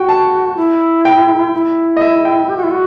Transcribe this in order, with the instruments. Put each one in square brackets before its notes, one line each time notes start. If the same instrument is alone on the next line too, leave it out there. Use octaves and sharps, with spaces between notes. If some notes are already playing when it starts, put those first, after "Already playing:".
Already playing: [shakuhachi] F#4 [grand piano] G5
[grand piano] A5
[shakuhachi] E4
[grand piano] G5
[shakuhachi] E4
[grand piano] D#5
E5
G5
[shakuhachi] G4
F#4
E4
F#4